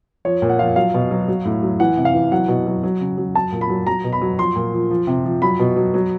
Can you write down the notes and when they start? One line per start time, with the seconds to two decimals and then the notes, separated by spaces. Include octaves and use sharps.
0.25 F3 C#5
0.42 A#2
0.49 F#5
0.59 F3 F5
0.76 F#3 F5
0.94 B2
1.11 F#3
1.28 F#3
1.45 A2
1.63 F#3
1.80 E3 F#5
1.97 C3
2.05 F5
2.14 E3
2.32 F#3 F#5
2.48 B2
2.67 F#3
2.84 F#3
3.01 C#3
3.18 F#3
3.35 F#3 A5
3.52 A#2
3.61 B5
3.70 F#3
3.87 F#3 A#5
4.04 B2
4.12 B5
4.22 F#3
4.38 F3 C6
4.56 A#2
4.73 F3
4.91 F3
5.07 C3
5.25 F3
5.42 F#3 B5
5.59 B2
5.76 F#3
5.94 F#3